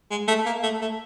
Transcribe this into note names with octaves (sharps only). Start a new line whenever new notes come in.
G#3
A3
A#3
A3
A3